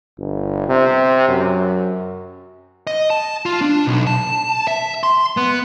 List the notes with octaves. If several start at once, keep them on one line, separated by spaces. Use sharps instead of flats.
G1
C3
F#2
D#5
A5
F4
D4
B1
A5
E5
C6
B3